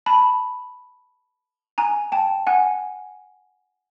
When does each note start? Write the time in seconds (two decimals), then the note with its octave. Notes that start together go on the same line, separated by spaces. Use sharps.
0.06 A5 B5
1.78 G#5 A#5
2.12 G5 A5
2.47 F#5 G#5